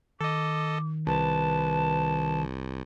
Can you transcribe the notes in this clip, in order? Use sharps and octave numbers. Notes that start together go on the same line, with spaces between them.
D#3 A4 D#5 D6
C2 B4 A5